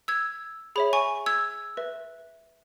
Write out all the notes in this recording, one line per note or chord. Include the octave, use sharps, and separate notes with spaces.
E6 G#6
G#4 C#5 E5 B5
G#5 C#6
E6 G#6
B4 E5